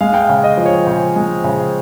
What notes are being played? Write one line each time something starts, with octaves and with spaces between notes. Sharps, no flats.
G#3 F5
G5
F5
C#3
D#5
F3
C#5
C#3 C5
G#3
C#3